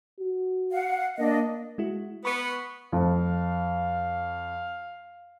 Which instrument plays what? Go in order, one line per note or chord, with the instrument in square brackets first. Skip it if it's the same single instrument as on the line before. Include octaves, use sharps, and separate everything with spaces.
[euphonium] F#4
[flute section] F5 F#5
[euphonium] A#3 [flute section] D4 D#5
[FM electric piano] G#3 E4 F#4
[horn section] B3 [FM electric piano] B5 C#6
[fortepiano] F2 [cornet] F5